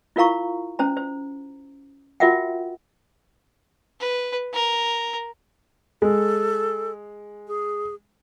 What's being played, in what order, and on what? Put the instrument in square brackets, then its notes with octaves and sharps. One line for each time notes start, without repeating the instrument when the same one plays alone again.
[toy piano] E4 F4 A#4 F5 A#5 C#6
C#4 C5 A#5
C5
F4 F#4 A#4 E5 F#5 G5
[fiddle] B4
A#4
[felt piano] G#3 [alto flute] A4
[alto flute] G#4